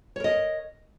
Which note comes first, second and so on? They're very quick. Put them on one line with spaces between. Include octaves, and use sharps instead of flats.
C#5 A#4 D#5